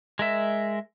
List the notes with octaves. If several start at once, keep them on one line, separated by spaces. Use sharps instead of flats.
G#3 A#4 E5